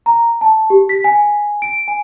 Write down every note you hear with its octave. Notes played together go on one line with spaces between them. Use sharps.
A#5
A5
G4
B6
G#5
D7
G#5